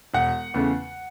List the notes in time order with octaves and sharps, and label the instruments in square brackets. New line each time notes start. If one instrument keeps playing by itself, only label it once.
[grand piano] E1 F#5
E2 C#3 A3